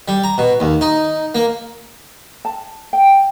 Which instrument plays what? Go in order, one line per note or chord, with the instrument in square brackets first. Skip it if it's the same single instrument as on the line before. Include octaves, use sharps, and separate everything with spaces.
[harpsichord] G3
A#5
B2
D#2
D#4
A#3
[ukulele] A5
G5